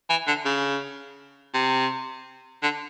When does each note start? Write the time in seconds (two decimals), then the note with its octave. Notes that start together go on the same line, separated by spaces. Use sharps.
0.10 E3
0.27 D3
0.45 C#3
1.54 C3
2.63 D3